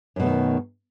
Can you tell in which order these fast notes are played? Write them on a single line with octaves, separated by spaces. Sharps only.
F#2 B2 A3 D#3